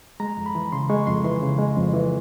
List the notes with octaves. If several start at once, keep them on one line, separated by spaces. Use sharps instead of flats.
G#3 A#5
F2
B5
E3
C#3 C6
G#3 C#6
F2 C6
E3 C6
C#3
G#3
F2
E3